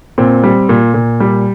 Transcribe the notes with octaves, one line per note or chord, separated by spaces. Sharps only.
A#2 C4
G3
A#2
A#2
G3